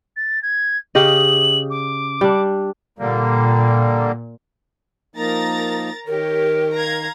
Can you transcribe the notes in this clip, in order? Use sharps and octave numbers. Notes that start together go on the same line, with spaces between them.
A6
G#6
C#3 G4 D#5 F#7
D6
G3 D4
A#2 D3 G3 A#3
F3 A#3 D#4 A#4 A#5 A6
D#3 G4 A#4 C#5
F5 A#5 G#6